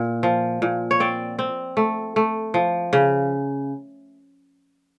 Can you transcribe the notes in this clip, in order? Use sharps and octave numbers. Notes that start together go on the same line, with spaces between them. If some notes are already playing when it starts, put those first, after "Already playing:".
Already playing: A#2
F3
A#2
C#5
C4 D5
C4
A3
A3
F3
C#3